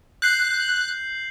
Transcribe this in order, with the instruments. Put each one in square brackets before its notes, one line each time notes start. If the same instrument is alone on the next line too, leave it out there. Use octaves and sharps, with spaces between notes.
[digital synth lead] F#6 [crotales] G6 C7 F#7